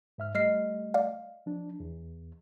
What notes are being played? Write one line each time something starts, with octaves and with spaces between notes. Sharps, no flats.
G#2 E5 F6
G3 A3 D#5 F6 C7
D5 F5
F3 D4
E2